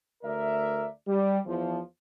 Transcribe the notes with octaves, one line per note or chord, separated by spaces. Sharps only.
D2 A#4 D5 E5
G3
E2 F3